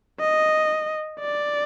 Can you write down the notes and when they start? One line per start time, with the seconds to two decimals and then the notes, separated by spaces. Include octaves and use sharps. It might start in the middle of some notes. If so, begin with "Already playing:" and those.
0.20 D#5
1.20 D5